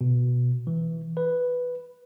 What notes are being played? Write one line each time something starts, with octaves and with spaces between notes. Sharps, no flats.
B2
E3
B4